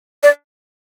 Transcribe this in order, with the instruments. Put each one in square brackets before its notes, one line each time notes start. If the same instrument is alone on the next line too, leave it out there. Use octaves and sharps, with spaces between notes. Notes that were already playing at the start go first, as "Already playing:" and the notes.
[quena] D5